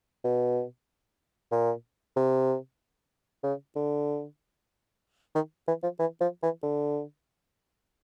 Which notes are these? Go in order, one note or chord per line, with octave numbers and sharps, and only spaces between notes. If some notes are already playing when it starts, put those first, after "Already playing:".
B2
A#2
C3
C#3
D3
D#3
E3
F3
E3
F3
E3
D3